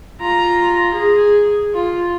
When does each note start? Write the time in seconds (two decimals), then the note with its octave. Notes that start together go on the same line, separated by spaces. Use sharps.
0.21 F4 A#5
0.95 G#4
1.74 F4